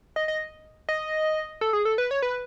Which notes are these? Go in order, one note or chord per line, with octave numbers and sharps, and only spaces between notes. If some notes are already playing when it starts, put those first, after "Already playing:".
D#5
D#5
D#5
A4
G#4
A4
B4
C#5
B4